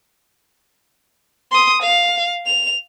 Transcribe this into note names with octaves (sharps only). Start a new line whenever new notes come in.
C6 D#6
F5
F7